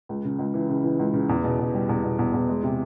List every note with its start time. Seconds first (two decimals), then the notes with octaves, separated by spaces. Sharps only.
0.09 C#2
0.24 C#3
0.39 C#2
0.54 E3
0.69 C#3
0.84 E3
0.99 C#2
1.14 C#3
1.29 E2
1.44 B2
1.59 E2
1.74 G3
1.89 E2
2.04 B2
2.19 E2
2.34 E2
2.49 G#3
2.63 C3